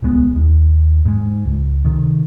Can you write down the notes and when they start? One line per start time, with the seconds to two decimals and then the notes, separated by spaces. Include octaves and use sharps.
0.02 D1 C2 G#3 B3
0.36 D#2
1.05 G#2 G#3
1.45 C#2
1.85 C3 D#3